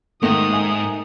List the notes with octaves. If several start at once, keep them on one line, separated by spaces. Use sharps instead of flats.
G#2 D#3 A3 A#3 D#4 D#6
E5 G#5